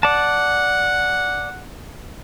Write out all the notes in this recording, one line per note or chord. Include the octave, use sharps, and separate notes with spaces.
D5 F#5 A5